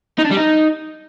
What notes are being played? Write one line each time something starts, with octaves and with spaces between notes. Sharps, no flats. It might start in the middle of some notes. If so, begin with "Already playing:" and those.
D#4
D4
G3
D#4